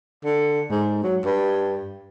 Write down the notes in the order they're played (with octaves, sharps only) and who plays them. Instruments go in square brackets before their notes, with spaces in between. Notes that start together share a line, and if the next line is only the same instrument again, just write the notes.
[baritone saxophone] D3
G#2
F#3
G2